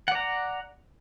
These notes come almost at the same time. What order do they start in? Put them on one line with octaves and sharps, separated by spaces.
F#5 D5 A#5